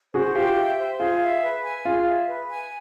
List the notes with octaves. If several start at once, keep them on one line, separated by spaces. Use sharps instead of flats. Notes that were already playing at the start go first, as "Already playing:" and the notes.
F#4 G#4 C5
F4 G4 G5
E5
C5
F4 G#4
E5
B4
G#5
F4 G#4
E5
B4
G#5